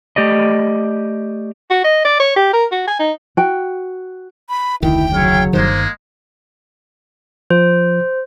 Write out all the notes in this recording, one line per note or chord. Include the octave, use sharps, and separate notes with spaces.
A3 G4 D5 D#5
F#4
D#5
D5
C#5
G4
A#4
F#4
G#5
D#4
F#4 G5
B5
F1 D2 D#3 E4 G5
C#3 F#3 E4 C#5 F5
G1 G2 D#3 G#3 A#3 C5
F3 C5